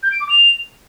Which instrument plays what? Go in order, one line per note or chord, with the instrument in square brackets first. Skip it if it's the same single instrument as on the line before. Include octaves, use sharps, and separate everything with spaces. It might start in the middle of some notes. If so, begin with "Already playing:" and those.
[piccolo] G6
D7
D6
F7